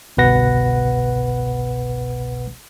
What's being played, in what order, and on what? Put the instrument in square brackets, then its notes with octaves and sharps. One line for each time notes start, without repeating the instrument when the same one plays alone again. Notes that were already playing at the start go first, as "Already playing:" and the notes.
[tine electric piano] G1 C2 B2 B4 F#5 A#6